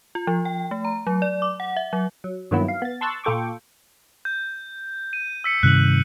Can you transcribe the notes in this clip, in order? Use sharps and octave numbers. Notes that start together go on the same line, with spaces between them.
F4
F3
G5
A3
A#5
F#3
D5
D6
F#5
E5
F#3
F#3
G2 D#3 F#3 A#3 B3 E4
F5
B3 A6
A5 C6 C#6 E6 F#6 A6
A#2 F4 A4 G5 C#6 D6
G6
D#7
E6 B6 C#7
G2 C3 D#3 F#6 F#7